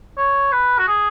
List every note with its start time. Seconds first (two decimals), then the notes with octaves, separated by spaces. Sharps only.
0.17 C#5
0.52 B4
0.78 F#4
0.88 G#4